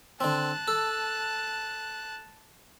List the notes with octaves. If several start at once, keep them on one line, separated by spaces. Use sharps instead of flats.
D3 C4 A5 F#6
A4